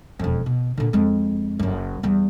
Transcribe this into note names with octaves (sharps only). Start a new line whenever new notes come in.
E1 F2
B2
A#2 D3
F2 G#3
F#1 F#2
E2 G3